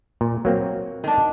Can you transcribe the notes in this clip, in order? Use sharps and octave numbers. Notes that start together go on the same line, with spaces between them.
A#2
F#3 A#3 C4
D#3 D4